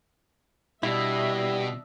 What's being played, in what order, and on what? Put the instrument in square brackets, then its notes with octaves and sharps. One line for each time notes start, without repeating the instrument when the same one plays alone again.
[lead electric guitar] B2 [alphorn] G3 [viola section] D4 D#5 E5 [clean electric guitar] E4